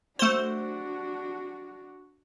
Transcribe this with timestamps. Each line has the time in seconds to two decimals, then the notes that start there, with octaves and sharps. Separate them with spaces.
0.19 A3 D4 F#4 C5